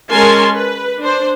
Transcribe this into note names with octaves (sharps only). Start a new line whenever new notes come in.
G#3 C#4 A#4 G#5 A5 C6
B4
D4 C5